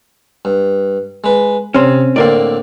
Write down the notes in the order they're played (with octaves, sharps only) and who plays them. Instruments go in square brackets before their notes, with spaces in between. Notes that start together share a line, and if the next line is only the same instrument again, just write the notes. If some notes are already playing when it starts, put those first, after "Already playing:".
[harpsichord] G2
G#3 B4
[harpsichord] C3 [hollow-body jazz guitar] C4 C#4
[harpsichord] A2 D3 C4 [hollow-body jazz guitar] A#3 A#4 D5